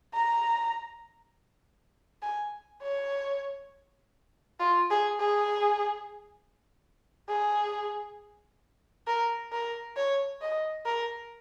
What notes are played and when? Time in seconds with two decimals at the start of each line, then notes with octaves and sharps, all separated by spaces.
0.14 A#5
2.22 G#5
2.82 C#5
4.60 F4
4.91 G#4
5.20 G#4
7.29 G#4
9.07 A#4
9.52 A#4
9.97 C#5
10.42 D#5
10.85 A#4